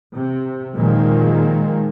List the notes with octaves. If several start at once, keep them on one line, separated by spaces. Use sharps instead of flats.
C3
A#2 D#3 F3 G#3 A#3